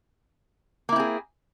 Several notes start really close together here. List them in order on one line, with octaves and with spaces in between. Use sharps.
A#3 E4 C4 G#4